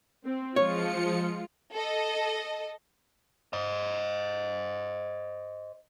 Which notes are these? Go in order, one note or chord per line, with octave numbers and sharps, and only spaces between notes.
C4
F3 G#3 F4 C#5 C#7
A4 D#5
C5 D#5